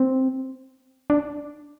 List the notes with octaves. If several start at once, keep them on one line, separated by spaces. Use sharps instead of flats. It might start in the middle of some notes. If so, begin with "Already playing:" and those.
Already playing: C4
D4